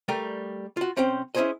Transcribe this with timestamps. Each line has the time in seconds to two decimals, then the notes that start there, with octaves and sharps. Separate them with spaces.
0.08 G3 A3 A#4 D5 G5
0.77 F4 F#4
0.97 B1 C4 C#4 C5 G5
1.35 C#4 E4 F4 G#4 C5 D#5